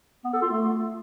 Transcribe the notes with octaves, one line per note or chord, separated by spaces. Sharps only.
B3
A4
F4
A3